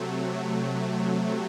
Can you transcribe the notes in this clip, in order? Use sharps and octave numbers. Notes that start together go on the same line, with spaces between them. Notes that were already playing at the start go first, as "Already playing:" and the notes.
Already playing: C3 F#3 A3